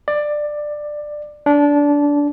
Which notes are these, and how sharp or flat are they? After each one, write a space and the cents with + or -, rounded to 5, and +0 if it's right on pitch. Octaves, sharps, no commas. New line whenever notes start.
D5 +15
D4 -20